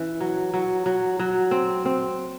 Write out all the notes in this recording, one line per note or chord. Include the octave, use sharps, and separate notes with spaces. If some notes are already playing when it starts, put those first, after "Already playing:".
Already playing: E3 C#4
F#3
F#3
F#3
F#3
C4
C4